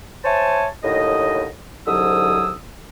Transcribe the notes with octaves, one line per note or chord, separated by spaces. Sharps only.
C5 C#5 E5 G#5 A5
D#2 A2 D3 D#5
C2 G#2 D3 F#3 D#6 E6